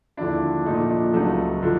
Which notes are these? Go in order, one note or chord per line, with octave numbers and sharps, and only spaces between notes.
D#2 D3 F3 G#3 D4 E4
A#2 F3 A3 D#4
D4
C#2 C#3 F#3 A3 D#4
D3 F3